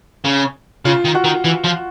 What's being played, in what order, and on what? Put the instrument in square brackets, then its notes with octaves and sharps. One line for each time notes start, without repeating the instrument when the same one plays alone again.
[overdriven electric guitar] C#3
[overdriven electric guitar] C#3 [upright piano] F4
[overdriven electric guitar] D#3
[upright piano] F#4
[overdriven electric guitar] D#3
E3
F3